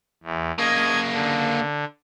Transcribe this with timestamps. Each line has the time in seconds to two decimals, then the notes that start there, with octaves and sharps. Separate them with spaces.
0.23 E2
0.59 C#3 A#3 D#5 G#6
1.13 D3